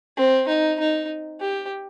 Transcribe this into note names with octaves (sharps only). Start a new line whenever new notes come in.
C4
D#4
D#4
G4